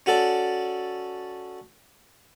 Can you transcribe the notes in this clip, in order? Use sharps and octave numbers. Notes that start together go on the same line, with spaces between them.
C#4 F#4 A4 D5